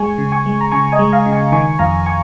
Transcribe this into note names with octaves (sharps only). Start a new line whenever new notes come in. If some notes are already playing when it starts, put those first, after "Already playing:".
Already playing: G#3 G#5 C#6
C#3
G#5 C#6
G#3
A#5
C#3 G#5 C#6
D#5 G#5
G#3
F5 A#5
C#3
G#5 C#6
D#3 G#5 C#6
F2 F5 A#5
G#5 C#6